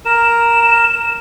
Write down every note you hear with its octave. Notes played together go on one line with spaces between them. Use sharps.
A#4 E7